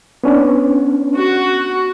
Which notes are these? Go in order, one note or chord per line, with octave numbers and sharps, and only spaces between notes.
B3 C#4 D4
F#4